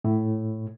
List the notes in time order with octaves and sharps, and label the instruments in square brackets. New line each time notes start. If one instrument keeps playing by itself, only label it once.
[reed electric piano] A2